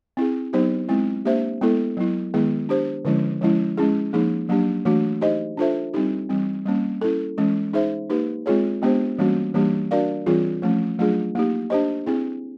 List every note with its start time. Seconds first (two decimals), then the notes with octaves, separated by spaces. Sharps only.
0.17 C4 E4 G#4
0.53 F#3 B3 D#4 G4 C5
0.89 G#3 C4 E4
1.25 A#3 D4 G4 C5 E5
1.61 G#3 B3 E4 A4
1.97 F#3 B3 E4
2.34 D#3 G#3 B3 E4 G#4
2.69 D4 G4 C5
3.05 D3 F3 G#3 C#4 E4
3.41 F3 G#3 C#4 E4
3.77 G#3 C#4 E4 G#4
4.13 F3 A#3 D#4 G#4
4.49 F#3 A#3 D4 G4
4.85 E3 A3 D4 F#4
5.21 D#4 G4 C5 D#5
5.57 D4 F4 A4 C5 E5
5.94 G3 C4 D#4 G4
6.29 E3 G3 C4
6.66 G3 A#3 C#4
7.01 C#4 E4 A4
7.38 E3 G#3 C#4
7.73 D#4 G#4 C5 E5
8.10 A#3 D#4 G4 B4
8.46 G#3 C4 F4 G#4 C#5
8.82 G#3 B3 D4 G4 C5
9.18 E3 G3 A#3 C#4 F#4
9.54 E3 G3 A#3 D4 G4
9.91 D4 F#4 A#4 D5 F5
10.26 E3 G3 C4 F4 G#4
10.62 F3 A3 C#4
10.99 F#3 A3 D4 F4 G#4
11.35 A#3 D#4 G4
11.70 D4 G4 C5 D#5
12.06 C4 E4 G#4